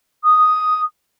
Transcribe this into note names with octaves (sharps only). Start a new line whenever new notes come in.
D#6